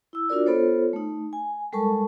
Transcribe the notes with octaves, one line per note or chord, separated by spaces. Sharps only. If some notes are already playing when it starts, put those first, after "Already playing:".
E4 E6
D4 F4 F#4 A#4 D5
B3 F4 A4 C5 C#5
A3 D#4
G#5
G3 G#3 A4 A#4 A5 C#6